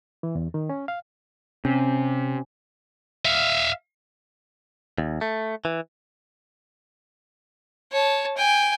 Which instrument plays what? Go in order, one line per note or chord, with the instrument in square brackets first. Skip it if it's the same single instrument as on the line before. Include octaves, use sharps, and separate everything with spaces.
[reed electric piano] E3
E2
D#3
C#4
F5
[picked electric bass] C3 [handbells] C#4
[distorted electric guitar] E5 F5
[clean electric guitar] D#2
A3
E3
[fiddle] C#5 A5
G5 G#5